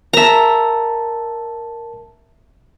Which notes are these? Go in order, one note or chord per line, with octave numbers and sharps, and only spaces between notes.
A#4 E5 A5 A#5